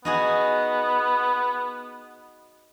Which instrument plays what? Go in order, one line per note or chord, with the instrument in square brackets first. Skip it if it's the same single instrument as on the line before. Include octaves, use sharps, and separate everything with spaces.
[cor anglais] B3 [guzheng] D#4 F#4 G#4